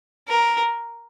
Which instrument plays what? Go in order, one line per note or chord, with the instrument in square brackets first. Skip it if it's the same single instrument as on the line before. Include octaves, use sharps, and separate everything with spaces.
[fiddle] A#4